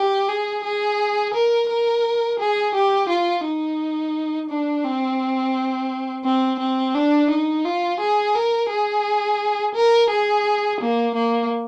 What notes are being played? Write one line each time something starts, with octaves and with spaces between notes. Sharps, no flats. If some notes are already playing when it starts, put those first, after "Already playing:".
Already playing: G4
G#4
G#4
A#4
A#4
G#4
G4
F4
D#4
D4
C4
C4
C4
D4
D#4
F4
G#4
A#4
G#4
A#4
G#4
A#3
A#3